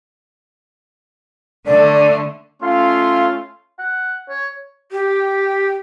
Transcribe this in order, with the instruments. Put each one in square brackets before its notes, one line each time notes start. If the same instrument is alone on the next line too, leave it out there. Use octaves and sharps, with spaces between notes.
[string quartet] D3 A3 [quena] D5
[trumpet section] A3 C#4 F4 F5 C6
[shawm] F#5
C#5
[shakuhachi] G4